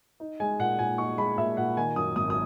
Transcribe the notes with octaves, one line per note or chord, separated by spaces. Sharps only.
D#4
G#3 G#5
A#2 F#5
A#2 G#5
D#4 C#6
G#3 B5
A#2 E5
A#2 F#5
D#3 G#5
F#2 D#6
G#1 D#6
D#6